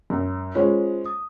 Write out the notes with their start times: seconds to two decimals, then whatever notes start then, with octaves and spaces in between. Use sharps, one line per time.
0.10 F#2
0.55 G#3 C#4 F4 C5
1.06 D#6